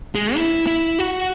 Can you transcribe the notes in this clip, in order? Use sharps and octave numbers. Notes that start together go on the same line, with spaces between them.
G#3
E4
E4
F#4